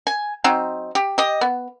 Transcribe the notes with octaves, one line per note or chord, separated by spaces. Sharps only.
G#5
F#3 C4 D#4
G4
G4 D#5
B3